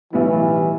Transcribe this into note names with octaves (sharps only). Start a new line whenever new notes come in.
B1 A2 E3 G3 B3 E4